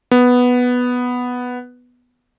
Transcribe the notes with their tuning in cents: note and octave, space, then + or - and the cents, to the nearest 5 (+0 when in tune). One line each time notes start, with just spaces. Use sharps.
B3 +0